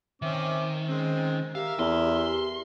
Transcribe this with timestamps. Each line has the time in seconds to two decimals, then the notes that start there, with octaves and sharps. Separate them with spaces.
0.22 D#3 C4 C#4 E5 D6
0.88 G#3 C4 C#4
1.55 G4 A#4 E5 F5
1.79 E2 C6